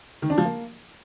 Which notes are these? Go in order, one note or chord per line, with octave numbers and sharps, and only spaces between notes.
D#3
D4
F3
A#3